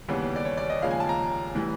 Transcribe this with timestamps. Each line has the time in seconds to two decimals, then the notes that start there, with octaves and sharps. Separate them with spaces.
0.08 D#2 C#3 E3 G3 B3
0.36 D5
0.45 C#5
0.57 D5
0.70 D#5
0.82 D#2 C#3 F3 G#3 F5
0.91 G#5
1.00 A5
1.09 A#5
1.55 A2 E3 G3